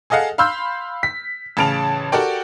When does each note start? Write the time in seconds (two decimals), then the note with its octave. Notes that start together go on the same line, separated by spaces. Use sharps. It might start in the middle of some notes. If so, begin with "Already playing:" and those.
0.10 G#4 A4 D#5 F5 F#5
0.38 F5 B5 C6 E6 F6 G6
1.03 B6
1.57 A1 C#3 A5 D7 F7
2.12 F#4 G4 A4 A#4 D5 G5